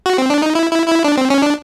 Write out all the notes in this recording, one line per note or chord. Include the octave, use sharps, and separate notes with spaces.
F#4
C4
D4
D#4
E4
E4
E4
D4
C4
C#4
D4